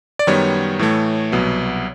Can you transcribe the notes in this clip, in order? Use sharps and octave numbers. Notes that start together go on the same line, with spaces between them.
D5
F#2 D#3 G3 B3 C#5
A2 E3 A3
C2 B2 F#3 B3